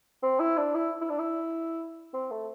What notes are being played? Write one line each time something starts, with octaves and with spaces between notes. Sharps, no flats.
C4
E4
D4
E4
E4
D4
E4
C4
A3